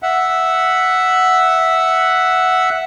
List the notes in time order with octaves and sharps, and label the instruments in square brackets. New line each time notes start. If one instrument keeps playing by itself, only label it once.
[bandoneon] E5 F#5